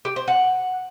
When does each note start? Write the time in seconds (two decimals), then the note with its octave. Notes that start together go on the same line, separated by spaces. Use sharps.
0.05 G4
0.16 C5
0.28 F#5